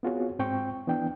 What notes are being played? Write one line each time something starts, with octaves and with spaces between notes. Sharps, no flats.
B3 C4 F4 F#4 G#4 C#5
G#2 C4 G5 C#6
E3 B3 D4 G5